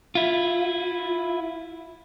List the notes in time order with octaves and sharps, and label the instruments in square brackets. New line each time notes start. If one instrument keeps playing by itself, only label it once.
[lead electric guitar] E4 F4